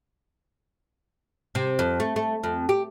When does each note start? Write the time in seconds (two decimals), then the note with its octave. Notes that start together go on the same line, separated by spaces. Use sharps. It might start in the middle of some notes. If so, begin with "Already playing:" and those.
1.55 C3
1.79 F2
2.00 A3
2.16 A3
2.44 F2
2.69 G4